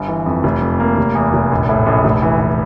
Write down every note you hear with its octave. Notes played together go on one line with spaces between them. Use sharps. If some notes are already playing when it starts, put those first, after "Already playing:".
Already playing: G1
E3
F2
F1
F2
A#3
F1
E2
F1
A#1
A2
A#1
F1
E3
E3